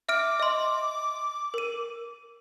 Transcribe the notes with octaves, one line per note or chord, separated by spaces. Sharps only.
E5 D6 F6 D7
D#5 C6
A#4 D#7